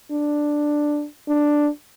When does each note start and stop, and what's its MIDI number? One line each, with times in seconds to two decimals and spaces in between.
0.11 1.05 62
1.28 1.68 62